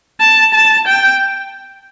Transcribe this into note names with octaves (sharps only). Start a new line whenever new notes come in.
A5
A5
G5